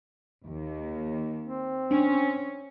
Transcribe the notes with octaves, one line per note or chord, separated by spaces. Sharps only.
D#2
C4
C#4 D4